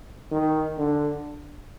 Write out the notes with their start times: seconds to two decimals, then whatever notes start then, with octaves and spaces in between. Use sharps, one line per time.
0.31 D#3
0.78 D3